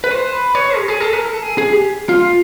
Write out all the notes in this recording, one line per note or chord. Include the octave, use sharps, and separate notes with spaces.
B4
C5
B4
C#5
G4
G#4
A4
A#4
A4
G#4
G#4
G4
F4